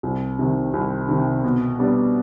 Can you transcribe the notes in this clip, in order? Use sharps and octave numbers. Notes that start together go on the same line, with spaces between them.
C2
C3 D#3
C2
C3 D#3
B2
G3 B3 D4